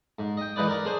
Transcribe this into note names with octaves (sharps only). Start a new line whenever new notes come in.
G#2
D#5 G5
E3 G#3 D#4 B4 D5
A#4 D5 A#5
D4 G#4 C5